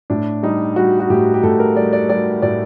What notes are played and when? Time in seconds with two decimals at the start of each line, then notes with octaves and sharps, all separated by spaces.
0.10 A2 D4
0.43 G3 D#4
0.76 G3 F#4
1.00 F#4
1.10 A2 G4
1.34 G4
1.43 A2 A4
1.60 A#4
1.76 G3 D5
1.93 D5
2.09 G3 D5
2.42 A2 D5